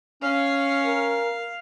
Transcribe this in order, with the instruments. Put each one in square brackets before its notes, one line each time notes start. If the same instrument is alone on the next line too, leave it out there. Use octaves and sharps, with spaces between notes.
[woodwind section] C#4 [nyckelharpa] F5
[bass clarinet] A#4